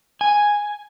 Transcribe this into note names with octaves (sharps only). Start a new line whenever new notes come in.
G#5